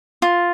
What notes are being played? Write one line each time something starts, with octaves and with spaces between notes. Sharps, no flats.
F4